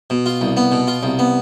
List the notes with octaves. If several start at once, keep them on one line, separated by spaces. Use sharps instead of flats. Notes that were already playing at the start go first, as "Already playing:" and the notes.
B2
F4
C2
B3
B2
F4
C2
B3